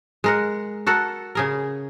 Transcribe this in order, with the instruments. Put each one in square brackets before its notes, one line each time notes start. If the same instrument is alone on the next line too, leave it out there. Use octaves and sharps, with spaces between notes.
[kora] G#3 A#4 F#5
F#4 A4 A#4 F#5
C#3 G#4 A#4